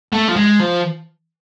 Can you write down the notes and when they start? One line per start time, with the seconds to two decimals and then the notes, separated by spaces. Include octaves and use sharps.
0.13 A3
0.29 F3
0.36 G#3
0.60 F3